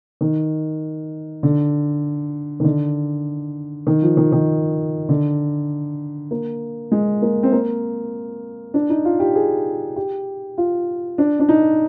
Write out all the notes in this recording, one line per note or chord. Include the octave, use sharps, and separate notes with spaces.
D#3
D3
D#3
D3
D#3
F3
D#3
D#3
D3
A#3
G#3
A#3
C4
A#3
D4
D#4
F4
G4
G#4
G4
F4
D4
D4
D#4